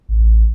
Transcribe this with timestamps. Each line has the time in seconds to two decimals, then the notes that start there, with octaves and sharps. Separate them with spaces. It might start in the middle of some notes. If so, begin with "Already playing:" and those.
0.09 A1